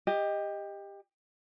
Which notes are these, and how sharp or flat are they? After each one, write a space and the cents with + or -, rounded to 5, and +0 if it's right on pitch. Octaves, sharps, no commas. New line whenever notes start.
G4 +20 D#5 +0